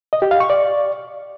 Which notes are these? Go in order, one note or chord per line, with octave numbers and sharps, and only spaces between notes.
D#5
G4
F5
C#6
D5